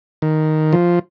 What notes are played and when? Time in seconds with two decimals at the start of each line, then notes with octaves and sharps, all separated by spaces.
0.22 D#3
0.73 F3